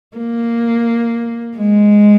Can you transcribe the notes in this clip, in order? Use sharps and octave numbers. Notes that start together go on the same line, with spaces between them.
A#3
G#3